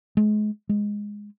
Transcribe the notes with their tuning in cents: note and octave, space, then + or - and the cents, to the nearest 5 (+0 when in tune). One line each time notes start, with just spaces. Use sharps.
G#3 +35
G#3 -5